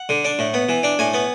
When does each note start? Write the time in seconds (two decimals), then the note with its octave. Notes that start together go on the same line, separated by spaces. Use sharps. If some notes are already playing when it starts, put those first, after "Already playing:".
Already playing: F#5
0.09 D3
0.25 D4
0.39 A2
0.54 B3
0.69 E3
0.83 D4
0.99 A2 G#5
1.14 B3